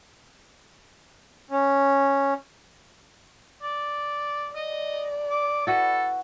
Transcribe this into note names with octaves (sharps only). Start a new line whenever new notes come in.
C#4
D5
D5 D#5
D6
E4 F#4 A4 B4